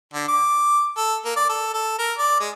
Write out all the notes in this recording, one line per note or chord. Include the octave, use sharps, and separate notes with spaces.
D3
D6
A4
A#3
D5
A4
A4
A#4
D5
G#3